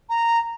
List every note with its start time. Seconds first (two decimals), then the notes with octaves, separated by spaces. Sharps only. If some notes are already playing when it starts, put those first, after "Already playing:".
0.10 A#5